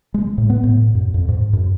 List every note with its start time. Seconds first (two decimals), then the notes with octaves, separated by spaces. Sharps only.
0.14 G#3
0.38 A2
0.50 B3
0.63 A2
0.95 F#2
1.14 F2
1.29 G#2
1.53 F#2